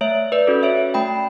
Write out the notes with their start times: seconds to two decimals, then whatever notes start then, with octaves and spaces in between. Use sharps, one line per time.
0.01 A3 C#5 E5
0.32 B4 D5
0.47 C#4 F#4 A4
0.63 C#5 E5
0.94 A3 G5 B5